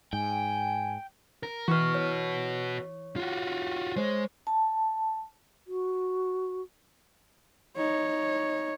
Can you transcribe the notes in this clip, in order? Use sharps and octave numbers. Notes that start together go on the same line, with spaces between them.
G#2 G5 G#5
A#4
E3 F#4 B4 C#6 F6
C#5
F4 F#4
G#3 C5 C#5
A5
F#4
D#4 C#5